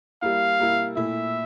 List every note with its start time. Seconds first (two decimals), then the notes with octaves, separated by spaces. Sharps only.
0.22 G3 A#3 E4 F5
0.59 G3 A#3 E4
0.97 A#2 A3 E4 E5